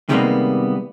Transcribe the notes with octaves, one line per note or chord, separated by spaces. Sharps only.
C3 D#3 G3 G#3 A#3 B3